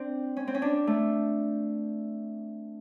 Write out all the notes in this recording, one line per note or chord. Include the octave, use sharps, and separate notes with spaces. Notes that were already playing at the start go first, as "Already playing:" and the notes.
Already playing: C4 D4
C#4
C4
C#4
D4
A3